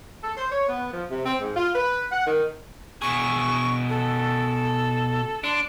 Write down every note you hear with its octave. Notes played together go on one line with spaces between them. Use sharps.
A4
C5
C#5
B3
F3
C3
C4
G#2
F4
B4
F#5
D#3
B2 G#4 C#6
A4
D4 C6